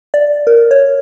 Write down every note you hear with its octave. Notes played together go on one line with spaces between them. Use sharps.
D5
A#4
C#5